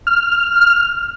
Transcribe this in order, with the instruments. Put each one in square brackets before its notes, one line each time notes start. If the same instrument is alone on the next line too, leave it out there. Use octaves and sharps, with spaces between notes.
[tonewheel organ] F6